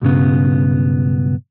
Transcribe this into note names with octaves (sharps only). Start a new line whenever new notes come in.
B1 G2 C#3 B3